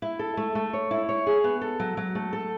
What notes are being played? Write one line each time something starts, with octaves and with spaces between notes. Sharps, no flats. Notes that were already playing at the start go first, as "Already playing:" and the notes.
E4
A4
A3
A3
C#5
E4
C#5
G#4
B3
A4
F#3
F#3
A3
A4